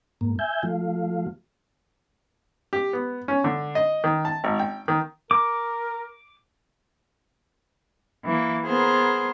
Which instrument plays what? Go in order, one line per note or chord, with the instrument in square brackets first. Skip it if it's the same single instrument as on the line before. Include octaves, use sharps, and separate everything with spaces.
[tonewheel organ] G#2 A#3
E5 G#5 G6
F3 A3 F4
[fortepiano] G4
B3
C#4
D3
D#5
D#3
A5
G#1
G5
D#3
[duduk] A#4 [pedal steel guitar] D6
[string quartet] E3 A#3
B3 G#4 A#4 C5 A#5